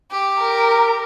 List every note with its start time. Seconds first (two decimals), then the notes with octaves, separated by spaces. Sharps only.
0.11 G4
0.40 A#4